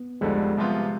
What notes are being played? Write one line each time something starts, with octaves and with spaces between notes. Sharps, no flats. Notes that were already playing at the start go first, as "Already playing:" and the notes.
Already playing: B3
F1 F2 D3 G3 G#3
C2 C3 F3 B3 F4